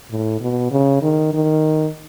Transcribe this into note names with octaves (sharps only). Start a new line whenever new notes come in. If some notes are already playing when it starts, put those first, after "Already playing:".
A2
B2
C#3
D#3
D#3